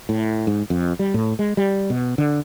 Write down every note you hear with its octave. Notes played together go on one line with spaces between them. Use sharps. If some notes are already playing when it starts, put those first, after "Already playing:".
A2
G#2
F2
G3
A2
G#3
G3
B2
D3